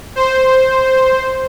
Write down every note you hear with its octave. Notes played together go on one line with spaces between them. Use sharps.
C5